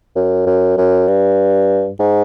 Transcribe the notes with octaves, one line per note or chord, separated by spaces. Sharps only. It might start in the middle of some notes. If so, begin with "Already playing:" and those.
F#2
F#2
F#2
G2
G#2